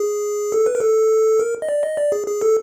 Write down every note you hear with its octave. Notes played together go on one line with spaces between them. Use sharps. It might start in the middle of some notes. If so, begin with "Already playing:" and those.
Already playing: G#4
A4
B4
A#4
A4
A#4
D#5
D5
D#5
D5
G#4
G#4
A4